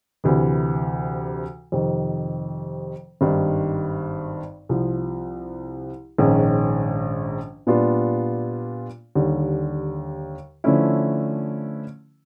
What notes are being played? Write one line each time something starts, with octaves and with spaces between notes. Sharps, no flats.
D2 C3 E3
F2 C3 D#3
G#1 G2 D#3
C2 C3 F3
A#1 G#2 D#3 G#3 C#4
A#2 G3 B3 D4 F4
D#2 D3 G3
D3 F3 A3 C#4 E4